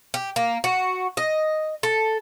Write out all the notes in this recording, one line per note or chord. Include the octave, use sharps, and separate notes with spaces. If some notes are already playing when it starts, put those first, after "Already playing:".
G4
A#3
F#4
D#5
A4